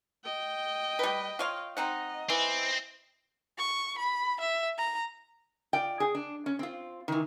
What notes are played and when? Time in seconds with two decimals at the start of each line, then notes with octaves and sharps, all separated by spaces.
0.24 D#5 G5
0.99 G3 B4
1.39 F4 C#5 F5
1.77 C4 D#4 D#5 F#5
2.30 E3 C4
3.58 C#6
3.98 B5
4.41 E5
4.78 A#5
5.73 F4 D5 G5
6.00 G#4
6.15 D4
6.46 C#4
6.59 C4 F4
7.08 D#3 E3